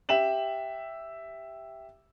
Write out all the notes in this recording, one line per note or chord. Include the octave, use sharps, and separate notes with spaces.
G4 E5 G5 E7 F#7